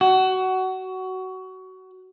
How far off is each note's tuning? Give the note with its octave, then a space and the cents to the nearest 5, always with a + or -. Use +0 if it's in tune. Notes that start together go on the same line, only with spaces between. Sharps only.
F#4 +20